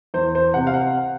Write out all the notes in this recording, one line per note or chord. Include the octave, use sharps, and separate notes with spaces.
E2 C5
C5
C3 F#5
F5
F#5